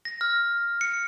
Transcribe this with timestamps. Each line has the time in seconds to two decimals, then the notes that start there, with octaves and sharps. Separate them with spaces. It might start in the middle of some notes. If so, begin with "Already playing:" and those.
0.05 A#6
0.21 F6
0.81 C#7